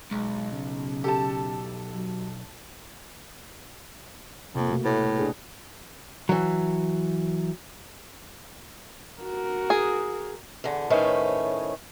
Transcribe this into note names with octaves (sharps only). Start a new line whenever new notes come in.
B1 G#3
C#3
G4 A4 A5
F#3
F2 C3 A#3
B2 A3 F#4
A2 B4
D4 G#4 B4
E3 F#3
F#4 A#4
G#4
E2 D3
A2 D#3 A3 C#4 B4 C5